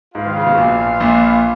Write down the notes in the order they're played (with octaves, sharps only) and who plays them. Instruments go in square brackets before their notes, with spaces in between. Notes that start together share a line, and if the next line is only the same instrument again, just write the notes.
[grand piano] G#2 [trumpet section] F4 B4 F5
[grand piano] D#3
C#3
B2
A#1 A#2
A#1 A#2